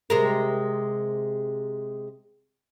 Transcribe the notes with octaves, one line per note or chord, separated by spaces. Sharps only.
C3 G#3 A#4